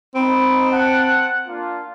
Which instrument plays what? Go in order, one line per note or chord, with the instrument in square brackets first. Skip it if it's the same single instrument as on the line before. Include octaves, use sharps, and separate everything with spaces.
[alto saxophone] C4 [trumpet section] D#4 B5
[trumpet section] F#5 A5
A#3 D4 F4